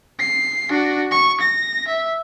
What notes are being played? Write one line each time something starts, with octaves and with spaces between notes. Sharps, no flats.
C7
D4 F#4
C#6
A#6
E5